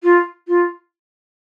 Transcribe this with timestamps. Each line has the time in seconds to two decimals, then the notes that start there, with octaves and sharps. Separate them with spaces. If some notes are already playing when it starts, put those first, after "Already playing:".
0.03 F4
0.48 F4